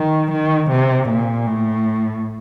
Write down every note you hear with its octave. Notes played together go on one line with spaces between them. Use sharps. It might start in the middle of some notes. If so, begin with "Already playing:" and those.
Already playing: D#3
D#3
C3
A#2
A2